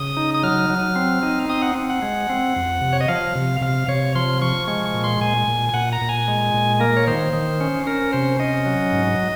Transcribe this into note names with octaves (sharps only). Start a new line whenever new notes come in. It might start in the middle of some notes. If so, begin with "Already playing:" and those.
Already playing: C#3 D#6
D#4
D#6
F#3 F6
F#3
C4
D#4
C4 D#6
F#5
C4
F#5
G#3
C4
F2
C3
C#5
D#5
F3 F5
C3
C3 F5
C3 C#5
F3 C6
F3 C#6
G#3 C#6
C#6
A#2
C6
A#2 G#5
A#2
G#5
A#2 F#5
A#5
A#2
G#5
G#3
A#2
A#3 A#4
C#5
D#3 C5
D#3
C#4
C#4 A#4
C3 C5
C#4 D#5
F#3
G#2